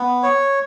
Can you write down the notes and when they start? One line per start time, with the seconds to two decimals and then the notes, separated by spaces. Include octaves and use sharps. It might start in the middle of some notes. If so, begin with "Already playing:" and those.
Already playing: B3
0.23 C#5